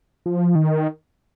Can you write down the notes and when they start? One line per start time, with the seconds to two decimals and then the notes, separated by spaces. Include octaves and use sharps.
0.26 F3
0.55 D#3